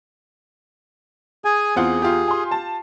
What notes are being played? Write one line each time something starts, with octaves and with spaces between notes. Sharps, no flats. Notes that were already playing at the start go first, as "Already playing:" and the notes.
G#4 G#5
E2 C4 F4 G#4 F#5
F4 G4
G#5 C6
A5